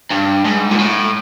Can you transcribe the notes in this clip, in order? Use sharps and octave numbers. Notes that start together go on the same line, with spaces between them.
G2
G#2
A#2
A2